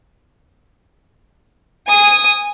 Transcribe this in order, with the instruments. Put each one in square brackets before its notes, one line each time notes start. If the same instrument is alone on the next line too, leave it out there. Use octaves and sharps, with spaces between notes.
[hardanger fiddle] G#5 D#6